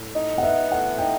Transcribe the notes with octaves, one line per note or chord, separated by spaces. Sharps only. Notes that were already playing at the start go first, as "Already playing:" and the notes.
Already playing: A2
D#4 D#5
F#5
B3 E5
A2 F#5
D#4 G5